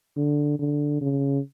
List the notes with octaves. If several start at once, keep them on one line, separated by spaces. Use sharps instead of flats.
D3
D3
C#3